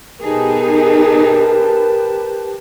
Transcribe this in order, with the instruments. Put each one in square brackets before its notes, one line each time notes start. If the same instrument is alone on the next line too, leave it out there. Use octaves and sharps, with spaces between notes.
[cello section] B2 D#4 G#4 [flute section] G4 B4 A5 [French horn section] A#4